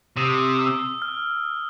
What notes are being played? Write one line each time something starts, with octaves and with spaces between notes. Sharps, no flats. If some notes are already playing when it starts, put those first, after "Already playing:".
C3 D#6
E6
F6